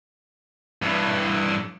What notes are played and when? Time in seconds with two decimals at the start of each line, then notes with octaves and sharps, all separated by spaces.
0.82 G2 E3